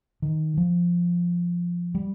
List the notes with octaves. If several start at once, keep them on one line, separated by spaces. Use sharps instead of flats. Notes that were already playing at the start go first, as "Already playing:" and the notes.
D#3
F3
G3